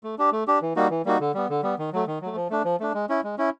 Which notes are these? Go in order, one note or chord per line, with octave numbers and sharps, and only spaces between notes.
A3
D4 G4
A3
D4 G4
E3
G3 A#3 D#4 F#4
E3
G3 A#3 D#4 F#4
D3
G3 B3
D3
G3 B3
D#3
F#3 A3
D#3
F#3 A3
F3
A3 D4
F3
A3 D4
G#3
C#4 E4
G#3
C#4 E4